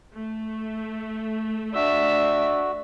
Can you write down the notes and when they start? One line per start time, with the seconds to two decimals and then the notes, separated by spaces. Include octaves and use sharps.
0.14 A3
1.75 D4 F#4 E5 E6